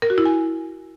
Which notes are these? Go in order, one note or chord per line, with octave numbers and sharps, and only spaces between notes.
A#4
F#4
E4
G#5